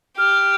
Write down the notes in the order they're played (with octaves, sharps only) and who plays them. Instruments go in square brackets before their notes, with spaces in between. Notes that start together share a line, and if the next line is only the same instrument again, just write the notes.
[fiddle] G4 [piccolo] F6